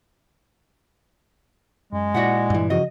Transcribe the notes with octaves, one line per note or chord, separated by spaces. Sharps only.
F#2 G#3
A#2 E4 F#4 D5 E5 F#5
G2 E3
C#3 F3 F#4 D#5